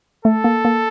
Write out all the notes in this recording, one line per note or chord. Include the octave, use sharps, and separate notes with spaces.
A3 A4
A#3
A#3